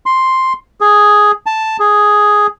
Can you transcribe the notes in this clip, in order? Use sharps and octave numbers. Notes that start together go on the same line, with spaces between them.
C6
G#4
A5
G#4